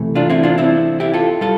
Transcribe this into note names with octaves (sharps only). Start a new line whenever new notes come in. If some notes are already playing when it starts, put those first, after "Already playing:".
Already playing: C3 E3 A3
D4 F4
C4 E4
D4 F4
C4 E4
E4 G4
F4 A4
G3 F4 A4